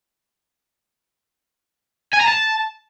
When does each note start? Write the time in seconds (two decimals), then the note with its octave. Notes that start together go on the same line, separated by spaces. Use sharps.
2.14 G#5
2.21 A#5
2.28 A5